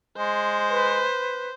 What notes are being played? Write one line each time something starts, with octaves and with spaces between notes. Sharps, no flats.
G#3 C5
B4